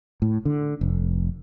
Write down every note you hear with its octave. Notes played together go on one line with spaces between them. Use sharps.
A2
D3
F1